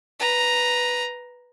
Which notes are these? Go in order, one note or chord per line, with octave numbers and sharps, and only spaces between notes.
B4 A#5